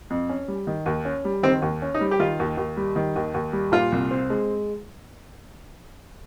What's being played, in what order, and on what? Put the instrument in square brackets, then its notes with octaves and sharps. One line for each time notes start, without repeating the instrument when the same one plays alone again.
[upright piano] F2
C#4
G3
D#3
D#2
C#4
G3
[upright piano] D#3 [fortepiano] C4
[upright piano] D#2
C#4
[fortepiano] D#4
[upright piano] G3
[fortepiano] G4
[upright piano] D#3 [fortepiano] F4
[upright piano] D#2
D#2
G3
D#3
D#2
D#2
G3
[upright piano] A#2 [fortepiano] F4
[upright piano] C2
C4
G#3